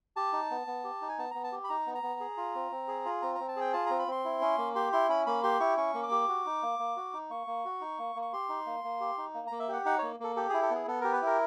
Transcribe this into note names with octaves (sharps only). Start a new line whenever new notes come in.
G4 A5
D#4
B3
B3
G4
D#4
G#5
B3 A5
B3 A#5
A5
G4
B5
D#4 A#5
B3
A#5
B3
G#4
F4
C4
C4
G#4
F4
C4 A#5
C4 A#5
A5
G#4 G5
F4 A5
C4 A#5
B5
C4 C6
E4
C#4
A#3
G4 C6
E4 C6
C#4 B5
A#3 B5
G4 C6
E4 C#6
C#4 C#6
A#3
D6
G4
F#4
D#4
A#3
A#3
F#4
D#4
A#3 C#6
A#3
F#4
D#4
A#3
A#3
C#6
G4 C6
D#4
A#3
A#3
G4
D#4
A#3
A#3 A#5
E5
G4 F#5
D#4 F#5
A#3 C#5
A#3 A4
G4 A4
E4 G#4
A4
B3 G#4
B3 A4
G4 A#4
B4
E4 A#4